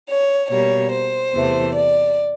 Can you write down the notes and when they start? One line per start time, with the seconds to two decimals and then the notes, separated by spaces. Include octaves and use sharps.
0.10 C#5
0.51 B2 G3 A#3 C#5
0.93 C5
1.35 E2 C3 E3 A3
1.76 D5